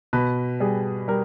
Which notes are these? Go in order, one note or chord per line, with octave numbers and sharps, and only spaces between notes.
B2 B4
G3 G#4
G3 A#4